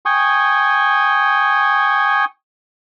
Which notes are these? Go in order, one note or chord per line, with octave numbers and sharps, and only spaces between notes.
G5 G#5 C#6 D#6